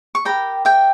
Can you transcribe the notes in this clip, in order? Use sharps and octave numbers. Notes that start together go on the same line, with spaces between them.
C#6
G4 A#4 D5 G5 B5
E5 G5